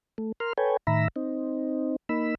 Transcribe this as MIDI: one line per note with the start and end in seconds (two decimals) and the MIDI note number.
0.18 0.32 57
0.40 0.53 70
0.40 0.53 84
0.40 0.53 89
0.58 0.77 69
0.58 0.77 71
0.58 0.77 73
0.58 0.77 79
0.58 0.77 80
0.87 1.08 45
0.87 1.08 51
0.87 1.08 76
0.87 1.08 82
0.87 1.08 83
0.87 1.08 88
1.16 1.96 60
1.16 1.96 63
2.09 2.35 58
2.09 2.35 63
2.09 2.35 83
2.09 2.35 88